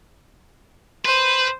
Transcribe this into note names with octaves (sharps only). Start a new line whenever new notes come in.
B4 C5